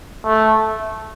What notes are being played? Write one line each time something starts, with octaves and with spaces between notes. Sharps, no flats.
A3